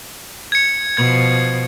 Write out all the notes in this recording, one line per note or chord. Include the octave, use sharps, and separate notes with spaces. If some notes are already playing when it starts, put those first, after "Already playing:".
G#6 C#7
B2 F3 G#6